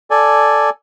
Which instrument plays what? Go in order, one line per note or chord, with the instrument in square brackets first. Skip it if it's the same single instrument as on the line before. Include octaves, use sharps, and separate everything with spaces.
[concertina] A4 D5 G#5